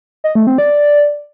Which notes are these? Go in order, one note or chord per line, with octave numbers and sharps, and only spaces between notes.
D#5
A3
C4
D5